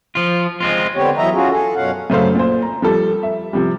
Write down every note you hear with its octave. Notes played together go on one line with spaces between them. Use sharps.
F3 F4
G#3 C4 F4
D3 B3 C4 G4 C#5
E3 F#3 B3 D#5 E5 A#5
C#4 F4 F#4 G#4
G#4 A4
F#2 B2 C#4 F5 F#5
F#2 C#3 A3 C5 F5
A#2 C5
A#5
F3 G3 A4
E5
C3 F3 G3